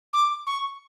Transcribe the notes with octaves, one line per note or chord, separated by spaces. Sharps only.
D6
C#6